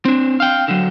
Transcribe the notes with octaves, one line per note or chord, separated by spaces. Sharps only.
C4 D4
F5 G5
D3 F#3